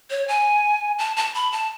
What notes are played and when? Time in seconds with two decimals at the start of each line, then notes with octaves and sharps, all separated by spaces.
0.10 C#5
0.28 G#5
0.99 A5
1.17 A5
1.34 B5
1.52 A5